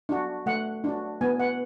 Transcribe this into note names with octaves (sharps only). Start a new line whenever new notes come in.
D4 F#4
A3 F#5
D4 F#4
B3 G#5
F#5